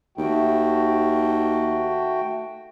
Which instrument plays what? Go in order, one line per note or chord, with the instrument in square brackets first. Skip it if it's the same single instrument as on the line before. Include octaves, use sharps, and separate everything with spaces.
[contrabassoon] D#2 [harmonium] A3 F#4 G5